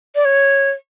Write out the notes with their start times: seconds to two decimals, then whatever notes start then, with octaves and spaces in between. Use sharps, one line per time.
0.15 D5
0.25 C#5